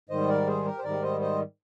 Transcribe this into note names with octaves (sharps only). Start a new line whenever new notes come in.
G#2 D#3 G3 C5 D#5
A#4 D5
G#4 C5
G4 A#4
C5
G#2 D#3 G3 A#4 D5
C5 D#5
C5 D#5